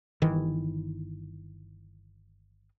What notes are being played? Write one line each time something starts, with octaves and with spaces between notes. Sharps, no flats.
G1 D#3 E3